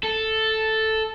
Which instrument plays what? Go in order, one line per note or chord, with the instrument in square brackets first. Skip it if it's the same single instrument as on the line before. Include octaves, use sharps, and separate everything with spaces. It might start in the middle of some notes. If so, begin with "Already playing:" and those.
[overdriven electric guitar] A4